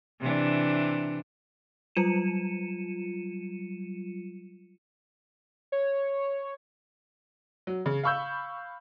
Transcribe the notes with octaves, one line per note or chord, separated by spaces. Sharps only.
C3 E3 D4
F#3 G3 F4 C#7 D#7 E7
C#5
F#3
C#3
F5 B5 C#6 E6 G6